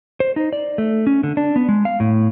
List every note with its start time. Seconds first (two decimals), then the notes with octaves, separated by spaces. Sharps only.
0.20 C5
0.36 D#4
0.53 D5
0.78 A3
1.07 C#4
1.23 D3
1.37 D4
1.56 B3
1.69 G#3
1.85 F5
2.00 A2